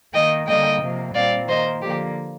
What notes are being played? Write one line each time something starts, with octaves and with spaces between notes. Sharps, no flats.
D#3 A#3 D#5 G5
D3 G3 A#3 D#5 G5
C3 F3 A#3
A#2 G3 C4 D5 F5
D#3 A#3 C5 D#5
D3 F3 A#3 G4